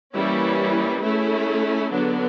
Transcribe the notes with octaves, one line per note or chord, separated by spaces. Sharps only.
E3 G3 A#3 C#4 E4
A3 C#4 E4 G#4
D3 F#3 B3 D4